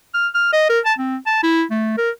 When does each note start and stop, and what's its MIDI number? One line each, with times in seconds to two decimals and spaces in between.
0.14 0.28 89
0.34 0.51 89
0.53 0.65 75
0.69 0.80 70
0.85 0.93 81
0.98 1.16 60
1.26 1.41 81
1.43 1.63 64
1.71 1.96 57
1.98 2.10 70